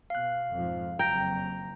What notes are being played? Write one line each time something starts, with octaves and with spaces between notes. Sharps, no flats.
B2 F5 F#6
F2 G#2 F3
F#1 F2 G5 A#5 A#6